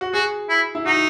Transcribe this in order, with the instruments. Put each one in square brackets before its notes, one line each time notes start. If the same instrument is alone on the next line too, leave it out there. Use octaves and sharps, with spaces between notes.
[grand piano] F#4
[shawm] F#4 [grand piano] G#4
[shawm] E4
[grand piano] E4
[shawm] D#4 [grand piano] F#4